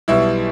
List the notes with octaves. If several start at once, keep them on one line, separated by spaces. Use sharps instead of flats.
B1 B2 G3 B3 E4 E5